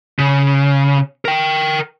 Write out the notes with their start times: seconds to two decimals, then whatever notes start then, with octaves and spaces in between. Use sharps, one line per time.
0.19 C#3
1.25 A#4 G5